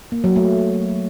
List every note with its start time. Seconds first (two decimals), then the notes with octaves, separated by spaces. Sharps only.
0.12 A#3
0.24 F#3
0.36 A3